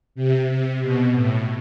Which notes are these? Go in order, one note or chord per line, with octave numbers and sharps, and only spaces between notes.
C3
C3
B2
A2